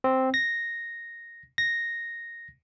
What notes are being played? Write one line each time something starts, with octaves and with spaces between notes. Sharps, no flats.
C4
A#6
A#6